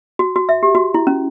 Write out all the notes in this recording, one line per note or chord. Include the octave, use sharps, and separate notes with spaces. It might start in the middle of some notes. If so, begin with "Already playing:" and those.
F#4
F#4
E5
G4
F#4
E4
C#4